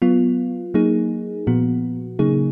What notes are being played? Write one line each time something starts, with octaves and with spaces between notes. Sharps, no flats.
F#3 B3 F4
F#3 A#3 D#4 G#4
A#2 F3 B3 F#4
C#3 F#3 A#3 D#4 G#4